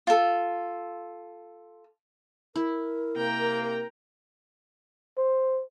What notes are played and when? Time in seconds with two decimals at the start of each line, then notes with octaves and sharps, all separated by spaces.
0.07 F4 A4
2.56 E4 A#4
3.16 C3 A#3 G5 A#5
5.17 C5